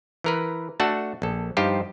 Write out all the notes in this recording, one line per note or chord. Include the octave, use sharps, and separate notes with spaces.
E3 A#4 B4
A3 D4 F#4 A4 F#5 A5
A#1 A4
G2 F3 D#4 F4 G4 C5